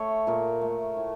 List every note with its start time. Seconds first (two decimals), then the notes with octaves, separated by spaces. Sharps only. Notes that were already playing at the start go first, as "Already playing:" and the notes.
Already playing: A3 C#5
0.27 A#2 A#4
0.61 A3
0.97 A2